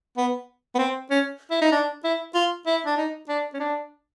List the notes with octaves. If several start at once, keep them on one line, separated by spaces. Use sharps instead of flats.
B3
B3
C4
C#4
E4
D#4
D4
E4
F4
E4
D4
D#4
D4
C#4
D4